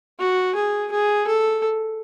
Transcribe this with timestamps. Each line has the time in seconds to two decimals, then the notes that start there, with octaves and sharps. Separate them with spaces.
0.19 F#4
0.55 G#4
0.91 G#4
1.27 A4